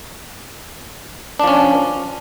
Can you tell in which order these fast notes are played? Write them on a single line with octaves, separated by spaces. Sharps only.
D4 F3 C#4